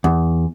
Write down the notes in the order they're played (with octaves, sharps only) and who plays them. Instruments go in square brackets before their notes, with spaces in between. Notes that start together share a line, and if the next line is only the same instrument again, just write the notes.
[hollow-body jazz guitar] E2